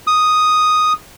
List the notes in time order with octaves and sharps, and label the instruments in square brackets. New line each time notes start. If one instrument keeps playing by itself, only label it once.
[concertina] D#6